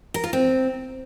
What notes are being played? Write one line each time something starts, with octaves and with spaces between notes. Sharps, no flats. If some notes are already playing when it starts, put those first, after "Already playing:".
A#4
F4
C4